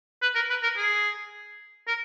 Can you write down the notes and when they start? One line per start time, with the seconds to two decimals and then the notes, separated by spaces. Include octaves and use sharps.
0.22 B4
0.35 A#4
0.50 B4
0.63 A#4
0.77 G#4
1.88 A#4